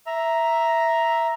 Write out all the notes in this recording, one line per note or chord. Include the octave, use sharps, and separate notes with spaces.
E5 A#5